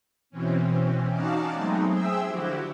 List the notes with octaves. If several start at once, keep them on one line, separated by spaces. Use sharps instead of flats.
B2 E3 C4 C#4
C#4 D#4 F#4 D5 F5 A5
F#3 G#3 A3 B3 C4 D#4
G#4 C5 E5 G5 E6
D3 F3 E4 F#4 G4